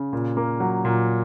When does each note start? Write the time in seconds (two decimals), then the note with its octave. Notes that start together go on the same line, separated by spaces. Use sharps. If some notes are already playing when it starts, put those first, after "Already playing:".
Already playing: C#3
0.13 A#2
0.37 A#3
0.60 F#3
0.85 A#2